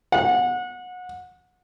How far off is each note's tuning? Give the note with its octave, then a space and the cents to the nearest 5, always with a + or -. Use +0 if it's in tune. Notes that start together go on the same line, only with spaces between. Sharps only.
F#5 -25